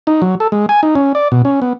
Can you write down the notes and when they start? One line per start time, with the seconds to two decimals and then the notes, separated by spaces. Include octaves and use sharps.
0.07 D#4
0.22 F#3
0.40 A4
0.52 G#3
0.69 G#5
0.83 D#4
0.95 C#4
1.15 D5
1.32 B2
1.45 C#4
1.62 B3